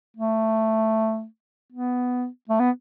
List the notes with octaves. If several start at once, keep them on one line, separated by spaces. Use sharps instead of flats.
A3
B3
A3
B3